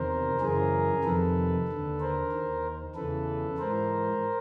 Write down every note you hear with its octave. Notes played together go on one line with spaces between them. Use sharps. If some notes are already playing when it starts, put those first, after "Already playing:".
Already playing: E2 C3 D#3 A#4 C5
F#2 C#3 E3 G#4 A#4
F2 C3 D#3 A4 B4
D#2 D3
A#4 C5
D#2 D#3
E2 C#3 E3 A4 B4
G#2 E3 A#4 C5